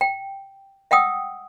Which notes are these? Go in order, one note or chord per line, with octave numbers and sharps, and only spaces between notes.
G5
E5 F#5 G5 D#6 E6